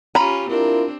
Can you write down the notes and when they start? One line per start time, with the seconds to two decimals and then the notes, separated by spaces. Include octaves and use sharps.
0.15 C#4 F4 G4 A#5 B5
0.49 C4 D4 E4 F4 A#4